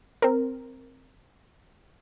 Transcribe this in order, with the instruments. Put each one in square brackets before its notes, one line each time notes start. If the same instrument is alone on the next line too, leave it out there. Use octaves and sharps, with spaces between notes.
[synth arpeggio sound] C4 A#4